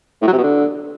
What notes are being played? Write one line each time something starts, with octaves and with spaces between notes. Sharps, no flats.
A2
F#3
C3
B2
D3